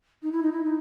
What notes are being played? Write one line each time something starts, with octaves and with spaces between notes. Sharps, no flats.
D#4
E4
D#4
E4
D#4